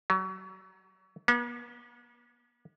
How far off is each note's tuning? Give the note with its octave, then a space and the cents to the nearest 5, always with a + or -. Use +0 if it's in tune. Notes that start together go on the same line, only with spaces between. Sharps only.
F#3 +30
B3 -45